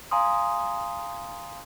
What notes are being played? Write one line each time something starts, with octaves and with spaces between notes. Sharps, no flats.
F5 G#5 A#5 C6 D#6